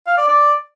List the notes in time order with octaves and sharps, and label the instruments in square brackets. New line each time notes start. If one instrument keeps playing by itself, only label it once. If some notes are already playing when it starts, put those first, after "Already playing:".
[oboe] F5
D5
D5